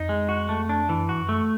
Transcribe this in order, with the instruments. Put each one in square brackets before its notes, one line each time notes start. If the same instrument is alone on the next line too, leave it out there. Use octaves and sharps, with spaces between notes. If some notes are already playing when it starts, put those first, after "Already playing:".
Already playing: [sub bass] F2 [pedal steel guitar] D#4
[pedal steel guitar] G#3
F#4
A3
D4
[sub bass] F#2 [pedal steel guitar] E3
[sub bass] G2 [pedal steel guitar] F#4
[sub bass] F#2
[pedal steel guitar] A3